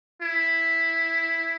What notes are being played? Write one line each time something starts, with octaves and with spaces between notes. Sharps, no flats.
E4